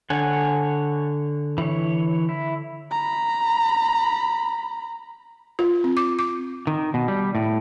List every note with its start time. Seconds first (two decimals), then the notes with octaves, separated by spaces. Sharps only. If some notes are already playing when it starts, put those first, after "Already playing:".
0.10 D3 C#5 F#5 G#5
1.58 E3 C#5
2.29 E4
2.91 A#5 B5
5.59 F4
5.84 C4
5.97 D6
6.19 D6
6.67 D#3
6.94 B2
7.08 G3
7.35 A2